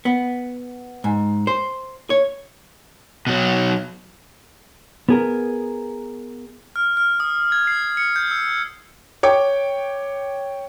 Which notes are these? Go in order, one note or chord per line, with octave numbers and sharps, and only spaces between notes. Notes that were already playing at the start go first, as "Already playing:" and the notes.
B3
G#2
C5
C#5
B2 F#3
B3 G#4 A#4
F6
F6
D#6
G#6
C7
C#7
G6
E6
C#5 G5 D6